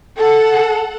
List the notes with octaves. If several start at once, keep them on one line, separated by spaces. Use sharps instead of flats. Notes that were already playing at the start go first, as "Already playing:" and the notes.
A4 F#5